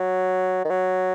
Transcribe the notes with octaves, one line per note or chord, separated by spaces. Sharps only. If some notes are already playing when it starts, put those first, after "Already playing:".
Already playing: F#3
D#3
F#3